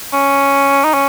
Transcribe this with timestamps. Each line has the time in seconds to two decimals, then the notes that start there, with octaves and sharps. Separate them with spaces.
0.13 C#4
0.85 D#4
0.94 C#4